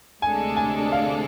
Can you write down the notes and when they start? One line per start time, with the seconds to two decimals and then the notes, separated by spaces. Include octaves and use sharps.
0.22 D2 C3 G#3 D4 A4 G#5
0.57 G#5
0.92 F5